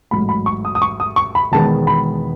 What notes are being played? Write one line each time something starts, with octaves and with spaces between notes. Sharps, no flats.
A1 G#2 F#3 A3 B5
B5
C#6
D#6
D#6
C#6
D#6
C#6
B5
E1 E2 D#3 G#3 B3 A5
B5